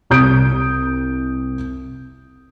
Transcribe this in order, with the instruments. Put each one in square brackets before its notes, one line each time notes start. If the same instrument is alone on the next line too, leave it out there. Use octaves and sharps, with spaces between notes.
[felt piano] C2 D#6 G6 D7